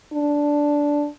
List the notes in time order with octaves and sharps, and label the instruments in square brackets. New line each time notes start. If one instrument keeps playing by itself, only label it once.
[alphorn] D4